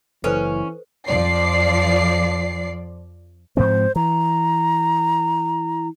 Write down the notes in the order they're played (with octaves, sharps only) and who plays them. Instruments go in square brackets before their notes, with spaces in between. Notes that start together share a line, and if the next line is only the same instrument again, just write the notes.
[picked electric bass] F#1 [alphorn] E3 [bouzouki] C#4 [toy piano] A4 B4 C5
[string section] F2 F3 D5 C7
[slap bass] G#2 F3 C4 [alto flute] C5
[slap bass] E3 [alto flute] A#5